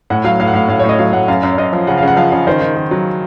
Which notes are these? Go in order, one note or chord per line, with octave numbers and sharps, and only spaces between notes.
A2 F#5
F#3 F5
A2 F5
F#5
A2 F5
A2 F5
A2 C#5
D#5
F#3 F5
A2 F#5
F#2 F5
F#2
C#5
F#2 D#5
F3
C#3 F#5
F5
C#3
F#5
F3 F5
C#3
D#3 C5
D#3
D#3
F#3